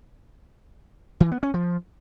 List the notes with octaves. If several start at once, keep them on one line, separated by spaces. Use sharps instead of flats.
E3
B3
C#4
F3